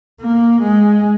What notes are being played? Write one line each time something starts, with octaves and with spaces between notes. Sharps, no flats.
A#3
G#3